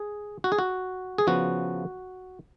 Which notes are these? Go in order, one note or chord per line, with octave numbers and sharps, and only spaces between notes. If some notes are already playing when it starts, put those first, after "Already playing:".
Already playing: G#4
F#4
G#4
F#4
G#4
C#3 F3 B3 F#4